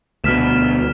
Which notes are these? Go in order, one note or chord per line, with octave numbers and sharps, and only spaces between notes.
D2 B2 F6 B6 E7